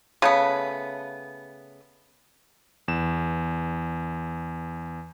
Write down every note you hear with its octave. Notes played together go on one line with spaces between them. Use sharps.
C#3 A3 B3
E2 E7